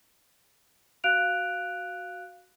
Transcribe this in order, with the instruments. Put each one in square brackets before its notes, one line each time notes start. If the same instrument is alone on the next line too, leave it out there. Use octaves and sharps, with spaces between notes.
[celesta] F#4 F5 F#6 D7 F7